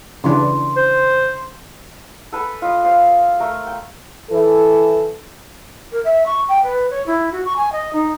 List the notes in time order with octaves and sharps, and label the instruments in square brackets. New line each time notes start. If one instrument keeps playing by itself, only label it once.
[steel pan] C#3 E3 D4 [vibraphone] C6
[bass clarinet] C5
[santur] A4 B4 G#5
F4 D#5
C5 F5
A3 A#4
G5
[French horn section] E3 A4
[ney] A#4
E5
C#6
G5
B4
C#5
E4
F#4
C#6
G#5
D#5
D#4